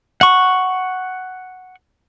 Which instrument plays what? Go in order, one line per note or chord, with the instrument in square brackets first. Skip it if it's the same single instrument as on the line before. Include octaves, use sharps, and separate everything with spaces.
[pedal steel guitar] F#5 C#6